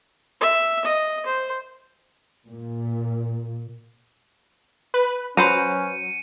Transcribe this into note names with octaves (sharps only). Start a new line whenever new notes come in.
E5
D#5
C5
A#2
B4
F#3 C#4 B4 C5 A#5 C#7 D#7